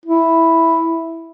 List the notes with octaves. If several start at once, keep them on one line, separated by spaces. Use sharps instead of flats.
E4